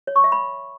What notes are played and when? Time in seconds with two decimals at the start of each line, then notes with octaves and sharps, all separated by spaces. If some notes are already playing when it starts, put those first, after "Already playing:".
0.07 C#5
0.16 C#6
0.24 E5
0.32 B5